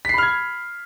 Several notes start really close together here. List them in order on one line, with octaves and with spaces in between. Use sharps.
B6 C7 B5 F6 G#6